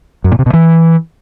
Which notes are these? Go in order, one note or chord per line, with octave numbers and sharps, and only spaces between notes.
F#2
A#2
C3
B2
E3